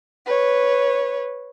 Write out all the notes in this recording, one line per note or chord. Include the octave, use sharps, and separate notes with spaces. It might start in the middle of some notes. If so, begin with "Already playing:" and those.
B4 C#5